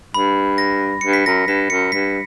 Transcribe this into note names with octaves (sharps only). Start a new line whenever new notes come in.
G2 B5
A#6
G2 C#7
B6
F#2 A#6
G2 B6
F#2 C#7
G2 B6